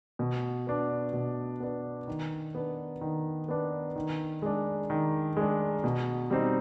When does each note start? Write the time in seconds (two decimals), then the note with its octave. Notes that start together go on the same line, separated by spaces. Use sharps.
0.19 B2
0.67 B3 D4
1.13 B2
1.60 B3 D4
2.07 D#3
2.55 B3 D4
3.01 D#3
3.48 B3 D4
3.96 D#3
4.42 G#3 D4
4.90 D#3
5.37 G#3 D4
5.84 B2
6.30 G3 C4 D#4